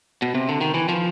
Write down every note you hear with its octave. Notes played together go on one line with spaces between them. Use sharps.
B2
C3
D3
D#3
E3
F3